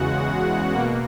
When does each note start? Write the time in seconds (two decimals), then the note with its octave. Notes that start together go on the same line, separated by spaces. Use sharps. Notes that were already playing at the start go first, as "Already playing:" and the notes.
Already playing: E2 C#3 G#3 F#4 F#5
0.71 B2 A#3